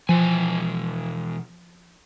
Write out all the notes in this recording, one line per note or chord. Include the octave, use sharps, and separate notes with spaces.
B2 E3 F3 G#5